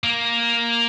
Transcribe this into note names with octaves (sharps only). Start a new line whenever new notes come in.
A#3